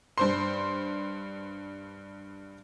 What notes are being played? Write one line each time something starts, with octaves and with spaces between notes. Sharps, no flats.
G2 C5 C6